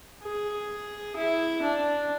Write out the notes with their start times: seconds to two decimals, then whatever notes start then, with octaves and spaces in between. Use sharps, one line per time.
0.24 G#4
1.16 E4
1.62 D4